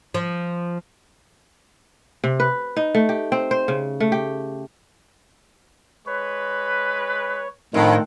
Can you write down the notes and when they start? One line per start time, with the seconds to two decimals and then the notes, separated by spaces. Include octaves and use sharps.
0.14 F3
2.24 C3
2.40 B4
2.77 D#4
2.95 A3
3.09 G4
3.32 C4
3.51 C5
3.68 C#3
4.00 A3
4.12 G4
6.06 G#3 B4 C#5
7.74 F2 A2 D#3 D4 A4 C5 F#5 G5